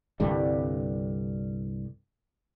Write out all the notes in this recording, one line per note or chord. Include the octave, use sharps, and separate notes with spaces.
C2 G2 D3 G3